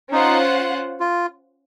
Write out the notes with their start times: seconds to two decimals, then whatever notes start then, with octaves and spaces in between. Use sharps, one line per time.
0.12 C#4 D#4 F4 C5 F#5
1.00 F4